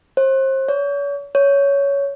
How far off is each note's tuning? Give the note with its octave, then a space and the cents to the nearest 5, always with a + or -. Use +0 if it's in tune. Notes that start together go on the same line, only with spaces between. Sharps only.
C5 +35
C#5 +40
C#5 +15